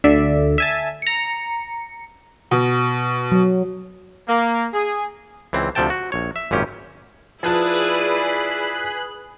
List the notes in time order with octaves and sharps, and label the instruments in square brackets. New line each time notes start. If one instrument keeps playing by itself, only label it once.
[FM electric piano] D2 D3 D5 E5
E5 G#5 A5
A#5 C#7
[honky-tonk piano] B2
[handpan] F#3
[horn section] A#3
G#4
[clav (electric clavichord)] C#2 E3 C4
D2 C3 F3 A4 G5 A5
F#4
A#1 C#5
E5
G#1 F#2 A#2 C#4 G4
[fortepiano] F3 A5 [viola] E4 D5 [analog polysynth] G#4 B4 F#6